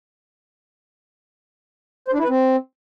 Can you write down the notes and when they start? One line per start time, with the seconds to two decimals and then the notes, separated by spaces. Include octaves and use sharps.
2.08 C5
2.13 D4
2.19 E4
2.24 B4
2.29 C4